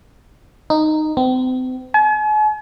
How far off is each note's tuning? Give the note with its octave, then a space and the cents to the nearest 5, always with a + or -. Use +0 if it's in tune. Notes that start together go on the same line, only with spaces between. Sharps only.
D#4 -10
C4 -40
G#5 +45